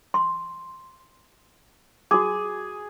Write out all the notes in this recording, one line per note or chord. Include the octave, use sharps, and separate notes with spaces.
C6
F#4 G#4 D6